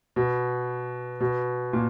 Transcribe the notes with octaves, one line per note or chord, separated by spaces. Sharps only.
B2
B2
A#2